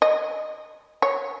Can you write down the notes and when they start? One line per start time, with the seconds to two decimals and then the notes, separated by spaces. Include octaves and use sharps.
0.02 D#5
1.02 C#5